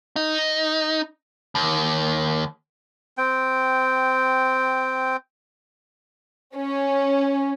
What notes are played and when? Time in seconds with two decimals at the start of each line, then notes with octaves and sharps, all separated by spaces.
0.16 D#4
1.55 D#2
3.18 C4 G5
6.55 C#4